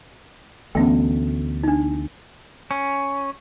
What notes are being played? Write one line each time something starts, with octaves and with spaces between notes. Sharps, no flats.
D2 E3 A3 B3 C#4 G5
D4 D#4
C#4